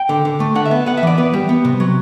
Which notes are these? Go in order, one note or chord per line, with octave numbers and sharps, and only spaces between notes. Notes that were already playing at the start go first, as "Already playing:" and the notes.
Already playing: G5
D3
D3
A3
D3 F#5
E5
B3
B3 F#5
E5
E3 D5
B3 B4
G3
B3
C3
F#3